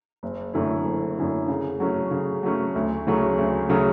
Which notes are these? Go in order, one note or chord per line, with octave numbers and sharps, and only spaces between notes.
F#1
F#2 D3 A3 E4
F#1
F#2 D3 A3 E4
C#3
F#3 A3 C#4
C#3
F#3 A3 C#4
D2
C#3 F#3 A3 C#4
D2
C#3 F#3 A3 C#4